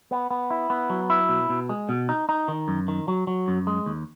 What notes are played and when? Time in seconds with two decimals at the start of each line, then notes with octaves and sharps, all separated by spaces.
0.11 B3
0.31 B3
0.51 E4
0.70 B3
0.90 F#3
1.10 E4
1.29 B2
1.50 B2
1.69 G#3
1.89 B2
2.09 D#4
2.29 D#4
2.48 D#3
2.68 F#2
2.88 D#3
3.08 F#3
3.27 F#3
3.48 F#2
3.67 G#3
3.86 D#2